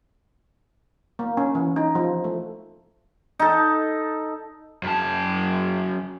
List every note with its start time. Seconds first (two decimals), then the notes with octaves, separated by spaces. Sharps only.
1.19 A#3
1.37 C#4
1.55 E3
1.76 D#4
1.95 F3
2.24 A3
3.39 D#4 A4
4.83 F#2 A5